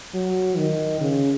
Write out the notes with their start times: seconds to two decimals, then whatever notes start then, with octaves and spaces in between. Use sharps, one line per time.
0.14 F#3
0.57 D#3
1.00 C#3